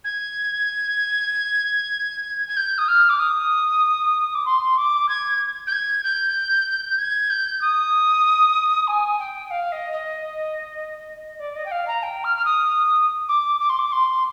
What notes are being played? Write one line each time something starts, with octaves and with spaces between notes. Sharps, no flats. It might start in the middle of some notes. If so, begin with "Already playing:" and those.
G#6
G#6
G6
D#6
F6
D6
D#6
D6
C6
D6
G#6
G6
G#6
G6
G#6
G6
D#6
G#5
G5
F5
D#5
D#5
D5
D#5
G5
F5
A#5
G5
F6
F6
D#6
D6
D6
C6
D6
C6